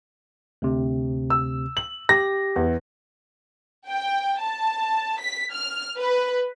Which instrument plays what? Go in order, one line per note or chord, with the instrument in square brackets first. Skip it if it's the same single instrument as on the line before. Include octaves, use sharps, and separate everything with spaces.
[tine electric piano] D2 C3
[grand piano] E6
F#7
[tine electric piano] G4 [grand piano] A#6
[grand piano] E2
[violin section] G5
A5
B6
F6
B4